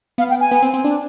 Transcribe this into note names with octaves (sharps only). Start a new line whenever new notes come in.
B3 F5
G5
G#5
B3
C4
C4
D4